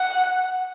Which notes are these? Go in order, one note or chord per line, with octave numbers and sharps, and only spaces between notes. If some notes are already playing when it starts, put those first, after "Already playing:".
Already playing: F#5